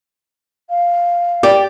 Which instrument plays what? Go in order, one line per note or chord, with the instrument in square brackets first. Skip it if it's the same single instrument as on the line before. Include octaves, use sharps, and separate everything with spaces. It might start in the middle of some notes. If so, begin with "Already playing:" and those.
[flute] F5
[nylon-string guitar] G4 [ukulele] D5